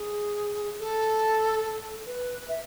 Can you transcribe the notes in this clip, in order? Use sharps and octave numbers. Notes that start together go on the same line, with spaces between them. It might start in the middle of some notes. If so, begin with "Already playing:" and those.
Already playing: G#4
A4
B4
E5